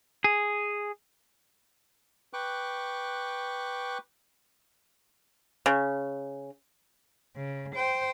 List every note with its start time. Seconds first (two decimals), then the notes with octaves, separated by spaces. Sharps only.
0.24 G#4
2.33 B4 G5 C#6 D6 F#6
5.66 C#3
7.36 C#3
7.76 C5 G5